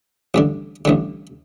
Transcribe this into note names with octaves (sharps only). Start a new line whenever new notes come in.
A1 G2 D3
A1 G2 D3